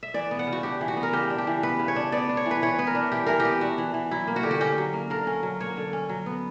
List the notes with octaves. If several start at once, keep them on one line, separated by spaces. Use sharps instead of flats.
E5
E3 D5
B3
F#5
C#3
F#4
D4 G4
E3
F#4
B3
A#4
C#3 G4
D4
G4
E3
B3 B4
C#3
C#5
D4
B3 D5
D4
C#5
E3
B4
E3 C#5
B3 B4
A#4
D4
E3 G4
E3 A#4
G4
B3
D4 F#4
E3
E3
F#3 E4
A#3
F#4
D3 G4
F#4
C#4 G4
F#3
A#3
D3 A#4
C#4
F#3
A#3 C#5
D3
C#4
F#3
B3